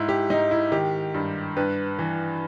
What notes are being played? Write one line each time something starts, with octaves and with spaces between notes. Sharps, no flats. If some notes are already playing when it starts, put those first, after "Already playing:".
Already playing: G#2 E4
G4
G#2 D#4
E4
D#3 G4
G2
G2 B4
E3